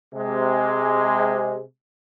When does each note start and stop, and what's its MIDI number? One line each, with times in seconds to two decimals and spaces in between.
0.13 1.60 48
0.13 1.60 56